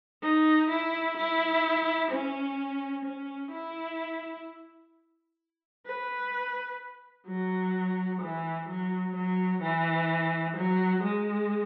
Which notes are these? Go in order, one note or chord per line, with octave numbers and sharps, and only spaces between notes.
D#4
E4
E4
C#4
C#4
E4
B4
F#3
E3
F#3
F#3
E3
F#3
G#3